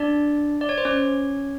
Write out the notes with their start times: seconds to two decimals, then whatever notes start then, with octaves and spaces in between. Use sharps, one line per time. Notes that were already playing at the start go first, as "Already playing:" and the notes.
Already playing: D4 D5
0.61 D5
0.69 C#5
0.78 C5
0.85 C#4 C#5